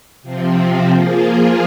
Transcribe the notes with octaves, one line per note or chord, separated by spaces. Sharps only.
C3 F3 C4
F3 A#3 F4 G#4